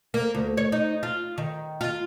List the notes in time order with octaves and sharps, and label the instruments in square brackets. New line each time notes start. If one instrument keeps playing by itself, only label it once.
[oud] A#3
D2
C#5
D#4
F4
D#3
F4